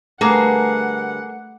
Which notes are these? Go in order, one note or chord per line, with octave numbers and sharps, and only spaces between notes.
D3 G3 A3 A#3 G#4 B4 F#5